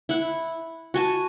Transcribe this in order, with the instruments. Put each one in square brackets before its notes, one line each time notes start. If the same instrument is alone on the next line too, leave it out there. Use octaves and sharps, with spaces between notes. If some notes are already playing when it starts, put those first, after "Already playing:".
[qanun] E4 F#5
F#4 G#5 A5